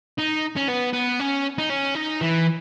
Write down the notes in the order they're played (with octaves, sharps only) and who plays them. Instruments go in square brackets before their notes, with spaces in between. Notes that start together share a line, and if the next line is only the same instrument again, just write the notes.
[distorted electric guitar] D#4
C#4
B3
B3
C#4
D#4
C#4
D#4
E3